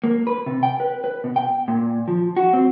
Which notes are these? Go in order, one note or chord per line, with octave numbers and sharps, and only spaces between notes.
A#3
B4
C3
G5
B4
B4
B2
G5
A#2
F3
F#4
C4